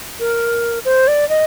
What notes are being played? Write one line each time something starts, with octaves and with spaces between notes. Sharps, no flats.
A#4
C5
D5
D#5